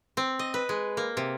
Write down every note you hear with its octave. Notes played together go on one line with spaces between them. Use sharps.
C4
D#5
B4
G#3
A#3
C3